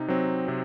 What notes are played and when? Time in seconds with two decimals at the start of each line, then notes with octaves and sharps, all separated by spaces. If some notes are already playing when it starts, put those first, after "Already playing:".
Already playing: C3 D#4
0.08 F#3 C4
0.48 C3